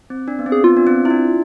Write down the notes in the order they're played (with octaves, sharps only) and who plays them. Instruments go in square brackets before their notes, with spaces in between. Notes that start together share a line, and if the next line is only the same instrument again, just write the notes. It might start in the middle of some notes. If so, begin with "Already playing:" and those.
[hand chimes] C4
D4
B3
C4
[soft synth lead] G#4
[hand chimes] B3 [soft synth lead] F4
[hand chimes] D4
C4
E4
D4